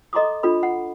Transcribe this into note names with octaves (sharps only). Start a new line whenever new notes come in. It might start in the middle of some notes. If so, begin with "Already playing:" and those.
A4 D#5 A#5 C6 D6 D#6
D4 F4 A4 B5
F#5